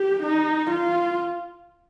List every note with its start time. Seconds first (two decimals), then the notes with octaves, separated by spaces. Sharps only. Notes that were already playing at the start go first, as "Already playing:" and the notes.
Already playing: G4
0.23 D#4
0.71 F4